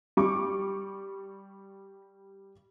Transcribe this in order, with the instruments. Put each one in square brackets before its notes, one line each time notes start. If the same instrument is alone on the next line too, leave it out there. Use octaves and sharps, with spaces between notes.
[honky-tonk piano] G3 C#6 D6